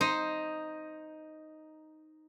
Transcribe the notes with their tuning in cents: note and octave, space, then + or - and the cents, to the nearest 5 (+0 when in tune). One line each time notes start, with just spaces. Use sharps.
D#4 +0 C5 +0